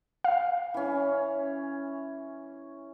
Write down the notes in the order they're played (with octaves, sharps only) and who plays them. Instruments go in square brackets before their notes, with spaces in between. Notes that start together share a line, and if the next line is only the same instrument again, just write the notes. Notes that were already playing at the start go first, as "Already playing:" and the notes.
[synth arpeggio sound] F5
[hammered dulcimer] E3 C#4